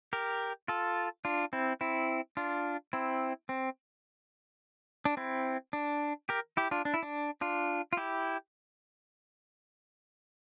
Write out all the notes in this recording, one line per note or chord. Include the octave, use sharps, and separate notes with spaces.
G4 A#4
F4 A4
D4 F4
C4 E4
C4 E4
D4 F4
C4 E4
C4
D4
C4 E4
D4
G4 A#4
E4 G4
D4 F4
D4
E4
D4
D4 F4
F4
E4 G4